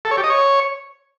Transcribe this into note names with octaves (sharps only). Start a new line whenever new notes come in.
A4
C#5
G4
D#5
C#5